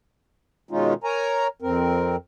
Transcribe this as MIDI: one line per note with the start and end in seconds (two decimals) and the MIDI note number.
0.71 0.94 47
0.71 0.94 51
0.71 0.94 56
0.71 0.94 61
0.71 0.94 63
0.71 0.94 65
1.04 1.47 70
1.04 1.47 73
1.04 1.47 80
1.04 1.47 82
1.62 2.16 41
1.62 2.16 60
1.62 2.16 70